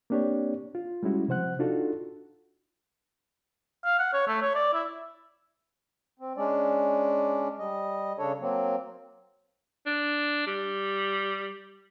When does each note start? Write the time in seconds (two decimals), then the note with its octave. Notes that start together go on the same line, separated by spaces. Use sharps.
0.10 A#3 C4 D4 G4 C#5 D5
0.75 F4
1.03 G3 G#3 C#4 E4 F#4
1.28 C3 F3 C5 F#5 F#6
1.59 D4 D#4 F4 F#4 A4
3.85 F5
3.99 F#5
4.14 C#5
4.28 A3
4.42 C#5
4.55 D5
4.73 E4
6.19 C4
6.37 G#3 C#4 D4 D5
7.59 G3 D#5
8.18 C#3 D4 A4 C#5
8.41 F#3 A#3 C4
9.86 D4
10.47 G3